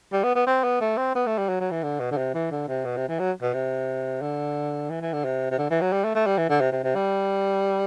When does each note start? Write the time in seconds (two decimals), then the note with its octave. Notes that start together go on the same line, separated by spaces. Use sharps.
0.12 G3
0.24 B3
0.35 B3
0.46 C4
0.64 B3
0.80 A3
0.97 C4
1.15 B3
1.26 A3
1.38 G3
1.49 F#3
1.60 F#3
1.71 E3
1.83 D3
2.00 B2
2.12 D3
2.17 C3
2.34 E3
2.51 D3
2.68 C3
2.85 B2
2.96 C3
3.08 E3
3.19 F#3
3.42 B2
3.54 C3
4.21 D3
4.90 E3
5.01 E3
5.13 D3
5.24 C3
5.51 C3
5.58 D3
5.70 E3
5.81 F#3
5.93 G3
6.04 A3
6.15 A3
6.26 G3
6.38 E3
6.49 D3
6.61 C3
6.72 C3
6.84 C3
6.95 G3